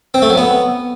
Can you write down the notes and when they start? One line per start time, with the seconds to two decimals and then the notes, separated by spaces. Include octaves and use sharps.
0.14 C4
0.22 A3
0.30 F#3
0.37 B3